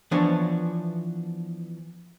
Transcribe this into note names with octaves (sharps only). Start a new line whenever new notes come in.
E3 F3 B3 D4 C#5